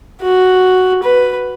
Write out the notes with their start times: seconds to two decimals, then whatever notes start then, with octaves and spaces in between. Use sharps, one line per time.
0.22 F#4
1.03 B4